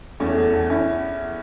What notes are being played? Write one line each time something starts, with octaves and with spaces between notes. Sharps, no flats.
E2 A3 C#4
E2
E2
E2 C#4 E4